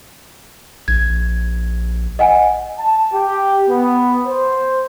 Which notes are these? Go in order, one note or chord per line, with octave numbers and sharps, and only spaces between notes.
A#1 G#6
D#5 F#5 G#5
A5
G4
B3
C5